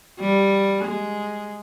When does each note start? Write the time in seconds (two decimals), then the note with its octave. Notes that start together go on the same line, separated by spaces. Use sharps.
0.20 G3
0.84 G#3